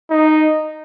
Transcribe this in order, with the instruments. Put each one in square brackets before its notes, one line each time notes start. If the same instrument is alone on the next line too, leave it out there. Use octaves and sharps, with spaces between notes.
[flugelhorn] D#4